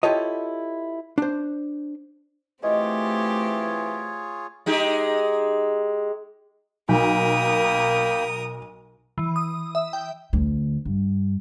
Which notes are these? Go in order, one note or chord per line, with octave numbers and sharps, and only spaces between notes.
E4 F4 G4 A4 C#5 D#5
D4 C5
E3 A3 C4 F4 G4 G#4 C#5 D#5
G#3 D#4 G4
B1 A#3 A#4 G5 B5 D#6
E3
D#6
E5
G5
D2
G2